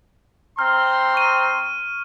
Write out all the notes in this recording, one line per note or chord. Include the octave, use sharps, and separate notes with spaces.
C4 A#5 C6 F6
C#6 D#7